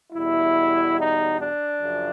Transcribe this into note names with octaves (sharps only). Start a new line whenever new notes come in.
E2 B2 G3 E4
D#4
D4
F#2 C#3 F3